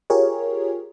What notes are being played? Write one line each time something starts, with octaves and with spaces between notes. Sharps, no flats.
F4 G4 G#4 A#4 C#5